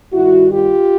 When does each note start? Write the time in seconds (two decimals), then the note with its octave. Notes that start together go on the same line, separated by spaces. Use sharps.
0.12 G2 D#3 G3 E4 F#4
0.51 F4 G4